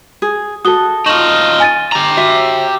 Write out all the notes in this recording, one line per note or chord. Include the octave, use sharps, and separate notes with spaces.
G#4
F#4 A4 D#6 G7
D#4 F4 C#6 E7 F#7
G#5 A6 D#7
G4 A#5
F#4 E5